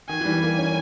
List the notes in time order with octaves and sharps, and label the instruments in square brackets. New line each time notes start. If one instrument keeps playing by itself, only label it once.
[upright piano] D#3 [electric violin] G#5
[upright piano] E3
G3
A#3
C#4